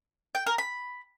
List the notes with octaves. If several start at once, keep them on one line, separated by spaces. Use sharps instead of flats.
G5
A#4
B5